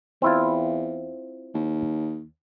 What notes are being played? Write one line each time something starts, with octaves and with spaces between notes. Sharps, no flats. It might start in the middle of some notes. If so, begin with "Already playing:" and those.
E2 C4 E4 F4
D#2